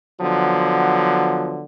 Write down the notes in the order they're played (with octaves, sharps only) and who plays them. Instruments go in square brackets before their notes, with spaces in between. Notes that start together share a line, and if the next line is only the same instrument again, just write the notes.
[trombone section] D3 F3 F#3 B3